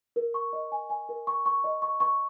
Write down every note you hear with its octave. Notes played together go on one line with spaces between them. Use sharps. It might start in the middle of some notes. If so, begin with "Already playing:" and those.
A#4
C#6
D#5
G#5
G#5
A#4
C#6
C#6
D#5
C#6
C#6